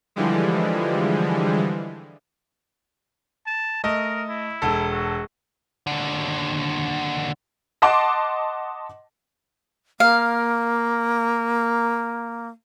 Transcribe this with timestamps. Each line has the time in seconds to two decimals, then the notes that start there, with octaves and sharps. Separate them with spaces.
0.16 D3 E3 F3 G3 G#3
3.46 A5
3.84 A3 A#4 D#5
4.29 E4
4.62 E1 A4
4.92 F#4
5.87 D#2 D3
7.82 D#5 F#5 A5 C6 D6
10.00 A#3 F5